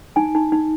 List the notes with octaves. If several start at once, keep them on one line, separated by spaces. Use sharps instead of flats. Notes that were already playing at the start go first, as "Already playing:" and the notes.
D#4 G#5
D#4
D#4